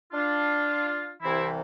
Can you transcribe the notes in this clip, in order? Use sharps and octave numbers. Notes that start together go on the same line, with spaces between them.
D4 F4
C2 C3 E3 C4 E4